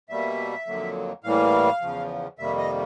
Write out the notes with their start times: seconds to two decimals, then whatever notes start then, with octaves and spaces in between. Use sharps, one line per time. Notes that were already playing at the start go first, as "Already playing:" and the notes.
0.09 B2 G3 A#3 E5
0.67 F2 D3 F#3 A#3
1.23 A2 E3 G3 A#3 F5
1.81 E2 C#3 F3
2.38 F2 C3 D#3 G3 A#3 E5
2.58 D#5